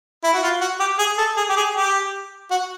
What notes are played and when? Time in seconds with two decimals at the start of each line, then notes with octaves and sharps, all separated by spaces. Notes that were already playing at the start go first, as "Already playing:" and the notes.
0.24 E4
0.34 F#4
0.43 F4
0.61 F#4
0.80 G4
0.99 G#4
1.18 A4
1.37 G#4
1.49 G4
1.56 G#4
1.75 G4
2.51 F#4